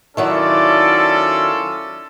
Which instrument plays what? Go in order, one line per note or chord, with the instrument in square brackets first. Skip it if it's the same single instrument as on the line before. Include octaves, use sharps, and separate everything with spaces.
[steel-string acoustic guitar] D#3 F#3 E4 [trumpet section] C#4 F4 A4 [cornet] D5